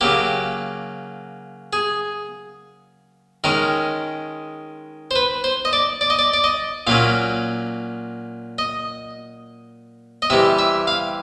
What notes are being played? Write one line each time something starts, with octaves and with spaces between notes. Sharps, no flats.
C#3 F#3 A#3 G4
G#4
D#3 G#3 C#4 A#4
C5
B4
C5
D#5
D5
D5
D#5
D5
D5
D#5
A#2 F#3 A#3 C#4 F5
D#5
D#5
C3 E3 G3 E5
E5
F5